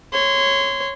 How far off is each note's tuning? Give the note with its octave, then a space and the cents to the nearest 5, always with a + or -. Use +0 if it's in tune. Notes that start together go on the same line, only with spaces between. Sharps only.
C#5 -15 C6 -25